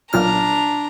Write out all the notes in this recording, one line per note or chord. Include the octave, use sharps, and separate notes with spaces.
B1 A#2 D4 A#5 F6